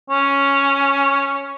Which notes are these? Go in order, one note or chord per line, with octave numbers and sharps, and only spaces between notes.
C#4